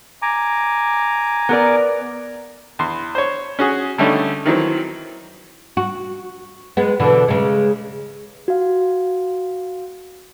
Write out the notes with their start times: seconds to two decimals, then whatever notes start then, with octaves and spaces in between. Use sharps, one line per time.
0.22 G#5 A#5 D6
1.49 B3 A#4 D5
2.79 E2 C6
3.15 C5 C#5
3.59 C#4 F#4 G#4
3.98 D3 G3 A3 C#4 D#4 A4
4.46 D#3 E3 F#3 C4
5.77 F#4
6.77 G#3 B3
7.00 B2 D3 E3
7.28 C#3 G#3
8.48 F#4 F5